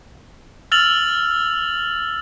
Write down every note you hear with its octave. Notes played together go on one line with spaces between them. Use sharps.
E6 F6 A6 F7 F#7